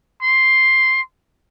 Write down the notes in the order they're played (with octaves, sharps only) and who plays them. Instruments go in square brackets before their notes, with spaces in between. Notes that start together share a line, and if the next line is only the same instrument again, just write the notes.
[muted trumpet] C6